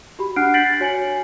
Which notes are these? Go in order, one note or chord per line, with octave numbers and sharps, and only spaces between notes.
F#4 G4 B5
D4 F#5 F6 F#6 C7 D7
G6 A6 B6 C7 D7 F#7
F#4 C#5 G#5 C#7 F#7